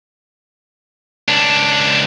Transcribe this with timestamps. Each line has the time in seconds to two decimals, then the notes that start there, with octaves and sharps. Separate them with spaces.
1.28 C#2 D4